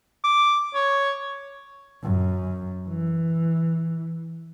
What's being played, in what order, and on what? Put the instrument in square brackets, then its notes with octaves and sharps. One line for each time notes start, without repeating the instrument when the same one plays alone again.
[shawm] D6
C#5
[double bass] F#2
E3